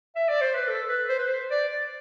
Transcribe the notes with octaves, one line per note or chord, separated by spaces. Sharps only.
E5
D5
C5
B4
A4
B4
C5
B4
C5
D5
D5